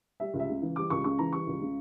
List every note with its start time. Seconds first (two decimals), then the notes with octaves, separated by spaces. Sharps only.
0.20 G3 E5
0.34 C#2
0.40 E5
0.49 C#3
0.62 E3
0.76 G3 D6
0.90 C#2 C#6
1.04 C#3 C#6
1.19 E3 A#5
1.33 G3 C#6
1.47 C#2
1.62 C#3